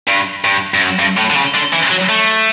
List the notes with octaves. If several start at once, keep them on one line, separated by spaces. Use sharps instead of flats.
G2
G2
G2
F#2
G2
A2
D3
C#3
D3
E3
F#3
A3